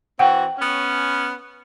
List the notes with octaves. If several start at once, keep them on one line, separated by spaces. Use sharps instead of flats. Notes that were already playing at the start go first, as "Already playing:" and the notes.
E3 C4 F#4 F#5 G5
B3 C#4